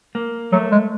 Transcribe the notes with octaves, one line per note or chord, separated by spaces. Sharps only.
A#3
F#3 A3
G#3